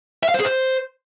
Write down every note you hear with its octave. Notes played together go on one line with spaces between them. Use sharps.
E5
F5
C5
G#4
C5